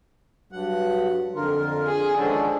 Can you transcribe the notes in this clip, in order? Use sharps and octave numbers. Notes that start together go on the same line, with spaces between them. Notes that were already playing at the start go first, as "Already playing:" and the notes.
G2 F#3 F#5
F2 D3 F4 A#4
G#4
C#2 D3 D#3 F3 C#4